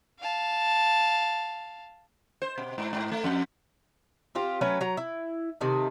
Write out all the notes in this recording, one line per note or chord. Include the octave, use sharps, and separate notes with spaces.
F5 A5
C5
B2
G#2
G#2
A3
F2
C4 F4 G4
F#3 A3 C#4 B4
F#3 A#5
E4
C3 D#3 A3